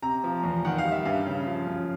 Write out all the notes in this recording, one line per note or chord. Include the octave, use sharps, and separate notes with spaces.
C3 A#5
F3
E2
D#3 F#5
F5
G3
E5
G2 F5
C#3
F3
F#2